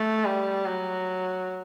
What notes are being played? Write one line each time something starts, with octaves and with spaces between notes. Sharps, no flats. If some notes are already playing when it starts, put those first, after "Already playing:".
Already playing: A3
G3
F#3